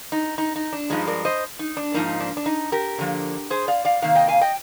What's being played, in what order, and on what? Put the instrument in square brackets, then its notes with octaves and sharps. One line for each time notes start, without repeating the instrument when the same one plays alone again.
[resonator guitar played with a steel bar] D#4
D#4
D#4
D4
G2 F3 G#3 D#4
A#4 D5
C5 D#5
D#4
D4
G#2 F3 A#3 D#4
D4
D4
D#4
G4 A#4
D3 F3 A#3
G#4 C5
D5 F5
D5 F5
C3 D#3 A#3 F5
D#5 G5
F5 G#5
D#5 G5